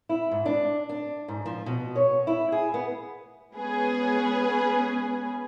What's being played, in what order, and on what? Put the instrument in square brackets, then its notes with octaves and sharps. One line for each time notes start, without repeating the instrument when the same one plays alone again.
[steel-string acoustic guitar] E4
G#2
D4
D4
G#2
F3
B2
C#5
E4
G#4
B3
[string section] G#3 B3 C#4 G#4 B4